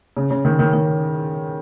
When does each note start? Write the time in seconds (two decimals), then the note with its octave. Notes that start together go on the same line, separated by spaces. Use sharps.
0.17 C#3
0.31 C#3
0.45 D#3
0.59 D#3
0.73 D#3